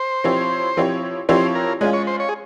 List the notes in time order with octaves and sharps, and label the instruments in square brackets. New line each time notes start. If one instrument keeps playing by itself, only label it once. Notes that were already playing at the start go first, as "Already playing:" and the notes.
Already playing: [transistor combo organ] C5
[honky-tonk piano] F3 C4 E4 G4 C#5
F3 C4 E4 G4 C#5
[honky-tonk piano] F3 C4 E4 G4 C#5 [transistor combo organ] C5
[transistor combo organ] A#4
[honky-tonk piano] G#3 C#4 F4 [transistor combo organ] G#4
[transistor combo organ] C#5
C5
C#5
G#4